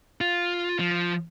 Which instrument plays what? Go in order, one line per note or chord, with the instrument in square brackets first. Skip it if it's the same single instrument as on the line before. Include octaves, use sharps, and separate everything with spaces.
[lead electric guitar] F4
F3